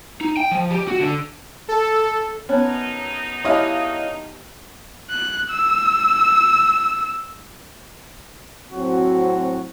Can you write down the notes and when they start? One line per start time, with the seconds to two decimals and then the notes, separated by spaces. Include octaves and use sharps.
0.21 D#4
0.37 G5
0.51 F3
0.71 G4
0.88 F#4
1.00 D3
1.68 A4
2.49 F#2 B3 C#4 D#4 A5 F#6
3.45 E4 G4 C#5 D#5 F5 A5 F#6
5.11 F#6
5.50 E6
8.72 A2 F#3 C4 F#4